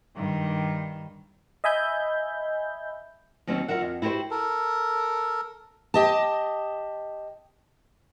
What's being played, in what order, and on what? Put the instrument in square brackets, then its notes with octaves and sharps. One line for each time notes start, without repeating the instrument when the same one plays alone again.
[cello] G2 D#3
[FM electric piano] D#5 E5 G#5 B5 G6
[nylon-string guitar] D#2 F#3 C4 C#4 D#4
F4 F#4 A#4 E5 F#5
F2
E4 F#4 G4 A#4 C5
[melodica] A4 A#4
[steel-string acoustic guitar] G4 D#5 A5